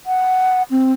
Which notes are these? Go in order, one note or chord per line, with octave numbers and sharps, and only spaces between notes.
F#5
C4